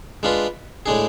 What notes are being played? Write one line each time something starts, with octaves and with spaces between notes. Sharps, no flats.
G#3 D4 F4 B4
A2 G#3 D4 G#4